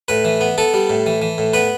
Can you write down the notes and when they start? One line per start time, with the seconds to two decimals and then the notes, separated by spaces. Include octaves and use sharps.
0.08 A2 B4
0.25 E3
0.41 B3
0.58 B3 A4
0.74 G3
0.89 A2
1.06 E3
1.22 E3
1.38 A2
1.54 B3 B4